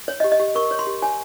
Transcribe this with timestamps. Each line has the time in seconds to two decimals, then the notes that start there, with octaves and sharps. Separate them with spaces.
0.08 C#5
0.20 D#5
0.24 G4
0.32 D#5
0.40 G4
0.55 A#4 C#6
0.71 C#5
0.79 C6
0.87 G4
1.02 C#5 G#5